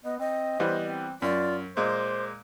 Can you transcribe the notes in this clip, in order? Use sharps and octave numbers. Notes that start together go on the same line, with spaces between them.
B3 D#5
C4 D#5
E3 G3 B3 C5
C4
F#2 F4 D5
A#2 G#3 C5 D6